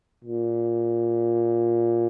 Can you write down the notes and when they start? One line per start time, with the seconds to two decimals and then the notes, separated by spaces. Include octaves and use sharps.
0.24 A#2